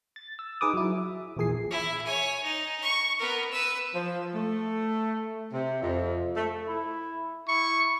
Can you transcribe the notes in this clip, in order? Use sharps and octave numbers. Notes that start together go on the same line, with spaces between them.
A6
E6
D#4 G#4 B4 D6 D#6
F#3 E4
E5
A#1 E2 A#2 G#4 G#5 C7
E4
C#5 G#5
D#4
C#6
B3 A#4
B4 E6
F3
A3
C3
F2
A3
E4
E4 C#6